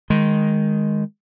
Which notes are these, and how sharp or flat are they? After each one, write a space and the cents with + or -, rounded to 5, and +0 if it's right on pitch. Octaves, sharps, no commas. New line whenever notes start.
D#3 +0 G#3 +0